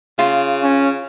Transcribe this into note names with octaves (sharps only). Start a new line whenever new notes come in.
C#3 F4
C#4